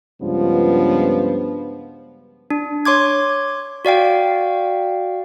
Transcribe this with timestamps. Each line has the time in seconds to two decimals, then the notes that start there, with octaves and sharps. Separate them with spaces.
0.22 C#2 G2 F3 B3
2.50 D4
2.85 C#5 C6 D6 G#6
3.85 F#4 D5 F5 G5